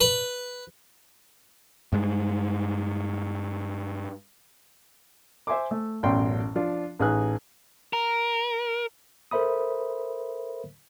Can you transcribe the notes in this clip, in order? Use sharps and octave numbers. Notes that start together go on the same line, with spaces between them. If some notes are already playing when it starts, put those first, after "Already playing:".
B4
G2 G#3
C5 E5 G#5 C6 D6
A3
A1 F#2 B2 D5 G5 C6
F3 D4 F4
A1 D#4 G#4 B4 G#5 F#6
A#4
A4 A#4 C5 E5 B5 D#6